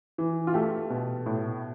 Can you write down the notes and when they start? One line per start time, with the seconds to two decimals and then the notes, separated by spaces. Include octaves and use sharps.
0.18 E3
0.47 F4
0.54 A3 G4
0.90 B2
1.26 A2